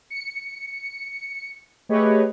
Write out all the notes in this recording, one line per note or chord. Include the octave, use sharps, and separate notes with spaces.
C#7
A3 G4 G#4 B4 C#5 D#5